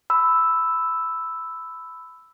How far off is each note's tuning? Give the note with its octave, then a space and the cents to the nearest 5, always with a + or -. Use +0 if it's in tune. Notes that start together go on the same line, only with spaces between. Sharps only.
B5 +15 E6 +0